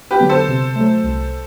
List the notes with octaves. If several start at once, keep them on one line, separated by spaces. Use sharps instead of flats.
G4 B4
D3 F#3 B3
A4 C5
C3
F#3 A3
C2